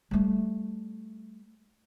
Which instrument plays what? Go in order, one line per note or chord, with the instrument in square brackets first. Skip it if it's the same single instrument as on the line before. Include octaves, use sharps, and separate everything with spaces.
[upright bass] G3 A3